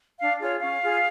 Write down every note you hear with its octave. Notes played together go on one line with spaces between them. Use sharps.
D4 F5
F4 G#4 C#5
C#4 F5
F4 G#4